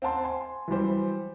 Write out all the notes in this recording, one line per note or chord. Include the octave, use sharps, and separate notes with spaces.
C4 F5 F#5 A5 C6
G#5 C6
E3 F#3 G3 C5